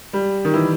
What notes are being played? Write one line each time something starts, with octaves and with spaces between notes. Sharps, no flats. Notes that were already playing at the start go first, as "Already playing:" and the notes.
G3
D#3
E3